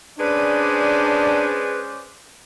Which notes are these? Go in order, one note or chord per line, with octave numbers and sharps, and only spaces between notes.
G#3 C#4 D4 B4 C5 D5